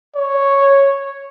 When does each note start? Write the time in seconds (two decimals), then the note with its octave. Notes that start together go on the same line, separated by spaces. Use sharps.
0.15 C#5